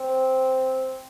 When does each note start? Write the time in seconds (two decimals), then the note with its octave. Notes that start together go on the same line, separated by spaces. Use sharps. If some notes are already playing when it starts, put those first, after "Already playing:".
Already playing: C4